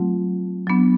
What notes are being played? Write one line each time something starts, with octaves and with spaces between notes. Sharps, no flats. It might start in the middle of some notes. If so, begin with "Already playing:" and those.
Already playing: F#3 A3 C4 F4
F#3 B3 D4